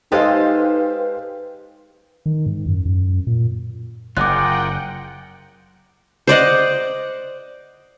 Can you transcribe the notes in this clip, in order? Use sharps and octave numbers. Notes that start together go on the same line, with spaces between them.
G#3 D#4 G4 A4 B4 C5 D#5 F5
D#3
G#2
F#2
F#2
A#2
F#1 F4 G#4 A#4 F#5 G5 D6 F#6
C5 D5 D#5 F#5